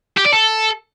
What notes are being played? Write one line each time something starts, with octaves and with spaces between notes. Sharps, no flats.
G4
D5
A4